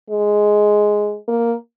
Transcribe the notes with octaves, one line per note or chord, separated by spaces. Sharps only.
G#3
A#3